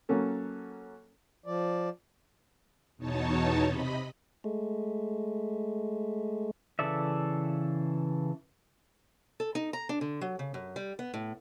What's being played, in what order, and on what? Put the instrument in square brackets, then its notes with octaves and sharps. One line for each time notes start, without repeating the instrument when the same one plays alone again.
[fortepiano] F#3 A#3 C#4 A4
[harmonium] F3 D5
[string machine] E2 B2 D#4 C#5 A5
C3 D#5 B5
[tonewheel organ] G#3 A3
[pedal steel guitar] C#3 E3 A4 D5 E5
[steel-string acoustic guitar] A4
D#4
A#5
D4
D3
F#3
C#3
F#2
G3
B3
A2